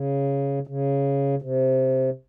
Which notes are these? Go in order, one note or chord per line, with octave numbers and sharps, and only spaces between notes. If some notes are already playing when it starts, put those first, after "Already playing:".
Already playing: C#3
C#3
C3